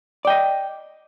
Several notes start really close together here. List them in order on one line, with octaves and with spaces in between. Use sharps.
D5 G5 D#5